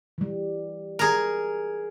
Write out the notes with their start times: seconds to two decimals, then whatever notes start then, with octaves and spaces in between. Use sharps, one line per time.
0.18 E3 G3
0.99 G#4 A#4